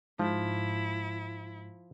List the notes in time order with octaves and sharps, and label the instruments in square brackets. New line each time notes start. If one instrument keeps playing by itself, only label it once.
[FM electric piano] G#2 [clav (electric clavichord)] F3 [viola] E4